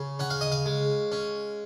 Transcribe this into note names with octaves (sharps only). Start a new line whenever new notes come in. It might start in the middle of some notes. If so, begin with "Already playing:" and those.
Already playing: C#3
C#4 F#5
F5
D#5
F5
G#3
C#4